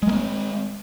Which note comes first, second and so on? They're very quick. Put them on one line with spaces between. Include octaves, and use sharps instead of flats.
G#3 A#3 C4